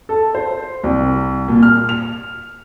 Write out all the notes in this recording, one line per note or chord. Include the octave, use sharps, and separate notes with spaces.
A4
C5
C2
A#2
F6
F7